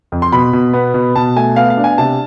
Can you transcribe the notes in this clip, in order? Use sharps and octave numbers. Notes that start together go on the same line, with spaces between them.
F2
C6
B2 B5
B2
B3
B2
B2 A5
A3 G#5
B3 F5
F5
D4
G#5
C3 A5